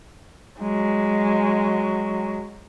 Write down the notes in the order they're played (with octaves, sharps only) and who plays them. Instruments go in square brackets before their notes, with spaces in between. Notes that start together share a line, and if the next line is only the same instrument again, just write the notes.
[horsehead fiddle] F#3 G#3